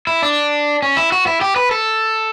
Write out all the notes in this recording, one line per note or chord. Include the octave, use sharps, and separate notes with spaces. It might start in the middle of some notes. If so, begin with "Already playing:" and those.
E4
D4
C#4
E4
F#4
E4
G4
B4
A4